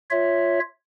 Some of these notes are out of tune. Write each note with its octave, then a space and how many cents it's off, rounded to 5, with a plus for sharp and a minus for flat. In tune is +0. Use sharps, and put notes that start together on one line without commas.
F4 +0 C#5 +0 E5 +0